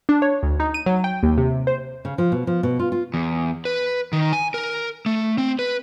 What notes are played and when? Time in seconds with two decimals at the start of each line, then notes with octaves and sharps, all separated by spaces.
0.09 D4
0.22 C#5
0.43 D2
0.60 D#4
0.74 D#7
0.86 F#3
1.04 G5
1.23 D#2
1.38 C3
1.67 C5
2.05 C#3
2.18 F3
2.32 B2
2.47 F3
2.63 B2
2.79 F4
2.92 F4
3.14 E2
3.65 B4
4.13 D#3
4.33 G#5
4.54 A#4
5.06 A3
5.38 C4
5.59 B4